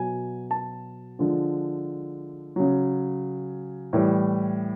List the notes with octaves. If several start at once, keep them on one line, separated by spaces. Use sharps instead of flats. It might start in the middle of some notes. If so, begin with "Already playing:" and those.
Already playing: B2 F#3 G#5
A5
D3 F3 G#3
C#3 F#3
A2 E3 G3